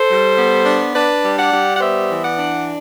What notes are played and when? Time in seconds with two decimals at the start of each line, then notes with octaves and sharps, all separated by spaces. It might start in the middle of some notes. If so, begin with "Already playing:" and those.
Already playing: A4 C5
0.09 G3
0.37 B3
0.65 D4
0.94 D4 B4 D5
1.24 G3
1.38 D5 F#5
1.52 G3
1.75 F#5
1.79 B3 C5 E5
2.09 E3
2.22 D5 F#5
2.38 D4